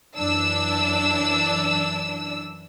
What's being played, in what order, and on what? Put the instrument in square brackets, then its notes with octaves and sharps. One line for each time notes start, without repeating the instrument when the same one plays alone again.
[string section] F#2 E3 D4 E6